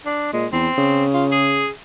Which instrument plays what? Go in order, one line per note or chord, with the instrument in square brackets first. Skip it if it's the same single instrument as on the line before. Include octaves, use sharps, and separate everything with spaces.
[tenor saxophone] D4
[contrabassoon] A#2 [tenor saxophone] G#3
[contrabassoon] E2 [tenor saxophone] C4
[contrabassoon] C#3
[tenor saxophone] F4
G#4